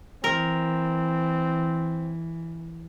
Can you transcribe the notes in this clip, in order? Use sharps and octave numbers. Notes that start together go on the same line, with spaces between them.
E3 C4 A#4